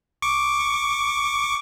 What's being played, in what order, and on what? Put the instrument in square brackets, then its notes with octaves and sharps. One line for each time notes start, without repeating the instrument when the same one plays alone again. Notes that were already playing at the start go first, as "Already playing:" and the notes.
[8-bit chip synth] C#6 D6